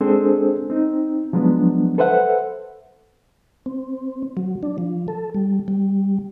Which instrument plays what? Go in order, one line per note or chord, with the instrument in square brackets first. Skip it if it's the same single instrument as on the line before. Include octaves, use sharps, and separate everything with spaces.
[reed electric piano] G#3 C4 D4 G#4 A4 C5
C4 D#4
F3 F#3 G#3 B3 D4
A4 B4 C5 E5 F#5
[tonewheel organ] C4
F#3
D4
F3
A4
G3
G3